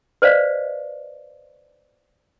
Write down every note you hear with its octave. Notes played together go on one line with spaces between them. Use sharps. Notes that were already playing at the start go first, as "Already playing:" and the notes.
B4 C5 D5 D#5 F5